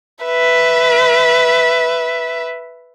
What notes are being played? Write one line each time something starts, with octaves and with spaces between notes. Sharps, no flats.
B4 E5